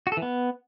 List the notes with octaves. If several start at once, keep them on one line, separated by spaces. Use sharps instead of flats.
F#4
A4
E3
B3